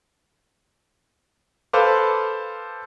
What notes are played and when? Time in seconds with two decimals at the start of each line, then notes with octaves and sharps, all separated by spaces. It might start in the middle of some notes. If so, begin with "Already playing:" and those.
1.73 A4 B4 C5 F5 D6